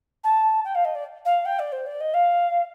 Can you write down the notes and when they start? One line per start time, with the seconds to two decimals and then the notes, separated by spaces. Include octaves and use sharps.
0.24 A5
0.65 G5
0.75 F5
0.85 D#5
0.95 D5
1.25 F5
1.45 G5
1.59 D5
1.72 C5
1.86 D5
2.01 D#5
2.14 F5